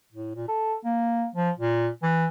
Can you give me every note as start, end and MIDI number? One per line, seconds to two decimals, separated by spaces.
0.13 0.36 45
0.36 0.48 46
0.48 0.75 69
0.85 1.26 58
1.36 1.51 53
1.59 1.89 46
2.03 2.27 52